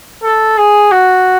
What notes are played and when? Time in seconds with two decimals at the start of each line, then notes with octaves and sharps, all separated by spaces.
0.24 A4
0.58 G#4
0.92 F#4